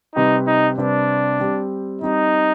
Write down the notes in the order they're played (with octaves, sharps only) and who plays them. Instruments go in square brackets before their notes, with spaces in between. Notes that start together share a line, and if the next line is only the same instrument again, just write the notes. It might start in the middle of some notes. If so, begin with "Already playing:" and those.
[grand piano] C3 G3 C4 G4 B4 [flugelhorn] D#4
[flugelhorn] D#4
[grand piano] C3 G3 C4 G4 B4 [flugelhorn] D4
[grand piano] G3 C4 G4
[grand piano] G3 C4 G4 [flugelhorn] D#4